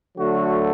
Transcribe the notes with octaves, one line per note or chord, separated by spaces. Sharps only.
D3 F#3 A3 F#4